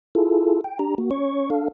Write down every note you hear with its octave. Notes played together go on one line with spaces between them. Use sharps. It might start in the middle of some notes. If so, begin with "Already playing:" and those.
E4 F4 G#4 A4
G5
D4 G4 A#5
A#3 F#4
C#4 C#5 C#6
D4 A4 F5